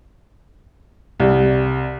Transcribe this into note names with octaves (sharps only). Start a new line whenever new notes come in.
C2